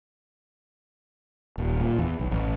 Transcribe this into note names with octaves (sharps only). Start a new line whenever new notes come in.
D#1
A#2
E2
B1
A1